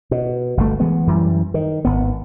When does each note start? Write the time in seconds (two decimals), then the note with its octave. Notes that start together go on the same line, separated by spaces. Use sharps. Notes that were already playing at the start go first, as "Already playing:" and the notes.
0.11 B2
0.57 G1 B2 A3
0.80 E3 G#3 B3
1.07 F#2 E3 G3
1.54 D#3
1.85 G#1 B3